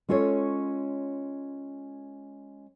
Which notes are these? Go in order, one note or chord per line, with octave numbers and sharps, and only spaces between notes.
G#3 C#4 F4 A4 C#5